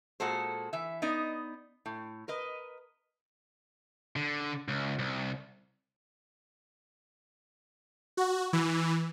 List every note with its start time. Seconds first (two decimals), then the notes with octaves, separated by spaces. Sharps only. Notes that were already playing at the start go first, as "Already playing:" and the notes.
0.20 A#2 G#3 F#4 A4 C5
0.73 E3 E5
1.02 B3 D#4 D5 D#5
1.86 A2
2.28 A#4 B4 D#5
4.16 D3
4.68 C#2
4.99 C2
8.17 F#4
8.53 E3